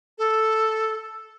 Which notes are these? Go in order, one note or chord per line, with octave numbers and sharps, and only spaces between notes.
A4